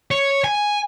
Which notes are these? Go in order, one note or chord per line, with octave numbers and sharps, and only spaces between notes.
C#5
G#5